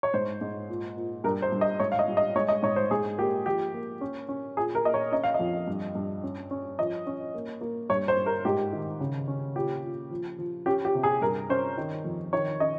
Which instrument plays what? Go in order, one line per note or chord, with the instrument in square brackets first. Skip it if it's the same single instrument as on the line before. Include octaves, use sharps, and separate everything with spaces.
[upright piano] C#5
G#2 C5
G#2
A#2
A#2
G2 A#4
C5
G2
D#5
G#2 C#5
F5
D#5
G3
D#5
G#3 C#5
D#5
G#2 C#5
C5
G#2 G#4
A#3 G4
F3 G4
A#3
C#4
C#4
A#2 G#4
A#4
A#3 D#5
C#5
C#4 D#5
F5
D#5
F2
G2
G2
C#4
C#4
F3 D#5
C#4
A#3
A#3
G2 C#5
C5
G2
A#4
G#2 G4
D#3
C#3
C#4
A#2 G4
A#2
F3
F3
C#4 G4
G4
C3
G#4
G2 A#4
C#4 C5
D#3
F2
D#3 C#5
C#4 D#5